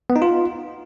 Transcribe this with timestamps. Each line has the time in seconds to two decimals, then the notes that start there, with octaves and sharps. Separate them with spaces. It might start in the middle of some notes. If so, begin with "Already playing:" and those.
0.10 B3
0.16 D#4
0.22 F4